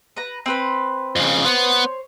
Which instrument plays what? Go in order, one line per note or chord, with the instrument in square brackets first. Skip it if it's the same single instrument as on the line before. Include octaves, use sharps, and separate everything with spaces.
[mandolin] B4 A#5
C4 B4 B5
[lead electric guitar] F2 C#3
[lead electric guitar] B3 [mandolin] C5 C#5